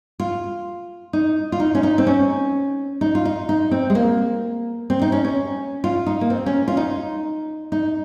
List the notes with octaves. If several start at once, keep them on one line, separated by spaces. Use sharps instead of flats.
F4
D#4
F4
D#4
C#4
D#4
C4
C#4
D#4
F4
D#4
D#4
C4
G#3
A#3
C4
D#4
C#4
C#4
F4
D#4
A#3
C4
C#4
F4
D#4
D#4